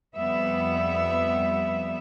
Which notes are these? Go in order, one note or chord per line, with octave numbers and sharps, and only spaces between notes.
F2 G3 B3 E5